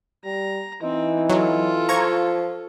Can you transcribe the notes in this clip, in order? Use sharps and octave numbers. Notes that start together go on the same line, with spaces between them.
G3 A#5
E3 C4 D#4
F#3 F4 A4
F3 A#5 C#6 G#6